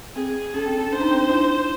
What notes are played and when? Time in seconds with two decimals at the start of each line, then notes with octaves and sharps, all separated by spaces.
0.15 C4 G#4
0.54 C#4 A4
0.66 C4
0.78 C#4
0.92 D4 C5
1.01 D#4
1.11 C4 D4
1.30 D4 E4